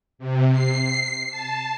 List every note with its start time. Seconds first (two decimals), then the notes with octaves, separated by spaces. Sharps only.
0.19 C3
0.52 C7
1.31 A5